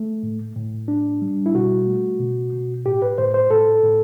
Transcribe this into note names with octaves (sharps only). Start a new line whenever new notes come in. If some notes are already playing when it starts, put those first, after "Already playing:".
Already playing: A3
A2
A2
D4
G3
E4
B2 F#4
A3
B2
B2
A2 G4
B4
A2 C5
C5
A2 A4
A2